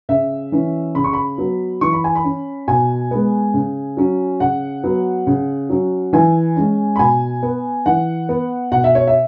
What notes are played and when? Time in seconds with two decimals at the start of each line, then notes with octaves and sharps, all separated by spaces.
0.09 C#3 E5
0.52 E3 C#4
0.95 C#3 B5
1.04 C#6
1.13 B5
1.38 F#3 B3
1.81 E3 C#6
1.93 B5
2.04 G#5
2.15 B5
2.24 C#4
2.68 B2 G#5
3.11 G#3 B3
3.54 C#3
3.97 F#3 C#4
4.40 C#3 F#5
4.84 F#3 B3
5.27 C#3
5.70 F#3 C#4
6.13 E3 G#5
6.56 G#3 C#4
6.96 B5
6.99 B2 G#5
7.43 B3
7.86 E3 F#5
8.29 B3
8.72 B2 F#5
8.84 E5
8.95 C#5
9.07 E5